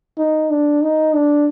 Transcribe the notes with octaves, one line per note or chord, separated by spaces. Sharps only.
D#4
D4
D#4
D4